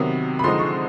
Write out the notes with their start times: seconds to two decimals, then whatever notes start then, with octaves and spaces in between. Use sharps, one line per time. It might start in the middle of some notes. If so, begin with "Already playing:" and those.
Already playing: C3 D#3 F#3 B3
0.39 B5
0.44 D3 F3 G#3 C4 D#4 C6
0.59 C#6